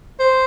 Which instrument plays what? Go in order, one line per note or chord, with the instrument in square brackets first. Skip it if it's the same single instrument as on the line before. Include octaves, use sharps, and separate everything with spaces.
[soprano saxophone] C5